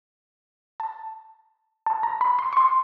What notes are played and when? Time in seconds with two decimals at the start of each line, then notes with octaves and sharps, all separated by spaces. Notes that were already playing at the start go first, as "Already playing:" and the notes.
0.80 A5
1.86 A5
2.03 A#5
2.21 B5
2.39 C6
2.53 C#6
2.57 C6